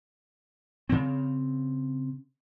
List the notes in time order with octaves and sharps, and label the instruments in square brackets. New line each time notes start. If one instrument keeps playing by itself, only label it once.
[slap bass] C#3 C4